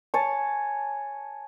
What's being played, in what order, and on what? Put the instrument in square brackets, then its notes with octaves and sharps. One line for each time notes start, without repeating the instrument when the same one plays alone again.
[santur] C#5 G#5 A5 C#6